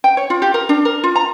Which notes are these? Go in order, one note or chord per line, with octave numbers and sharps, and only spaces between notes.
G5
C#5
F4
G4
A#4
D4
A#4
F4
A#5